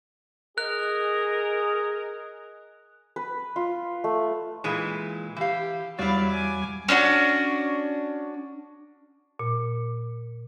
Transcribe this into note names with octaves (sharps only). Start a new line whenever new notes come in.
G#4 A#4 D#5 F#6
B4
F4
A3
A#2 E3 G#3
E3 G4 F5
E2 F#3 G3 E4 D5 F5 A6
G#5 D6
C#4 D4 F4 F#4
A#2